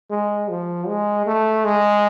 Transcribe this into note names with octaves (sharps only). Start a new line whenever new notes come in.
G#3
F3
G#3
A3
G#3